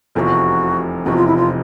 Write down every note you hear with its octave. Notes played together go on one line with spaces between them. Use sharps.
F1 E2 C3 F3 F#4 A4
F1 E2 C3 F3 F#4
F4
E4
F4